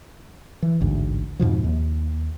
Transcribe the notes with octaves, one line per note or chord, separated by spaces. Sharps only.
E3
A1 D2 G#2
F2 G#2 B2 F3
D#2